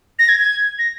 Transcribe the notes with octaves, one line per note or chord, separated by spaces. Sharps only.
A#6
G#6
G#6
A#6